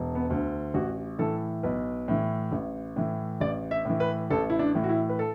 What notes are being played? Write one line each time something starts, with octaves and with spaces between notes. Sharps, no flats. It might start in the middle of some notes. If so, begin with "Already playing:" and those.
Already playing: E1
B3
D2 D3
A1 F#4
A2 E3 A4
B1 B4
A2 E3
A1
A2 E3
A1 D5
E5
A2 E3
B4
A1 A4
E4
D4
A2 E3
F#4
E4
B4
A4